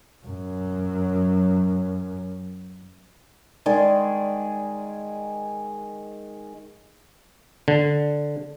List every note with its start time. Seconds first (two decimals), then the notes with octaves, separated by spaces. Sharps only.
0.25 F#2 F#3
3.66 D#3 G#3 G#4 D5
7.68 D3